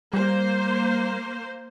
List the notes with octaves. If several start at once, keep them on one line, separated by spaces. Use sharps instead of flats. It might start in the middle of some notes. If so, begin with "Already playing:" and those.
G3 A#3 C5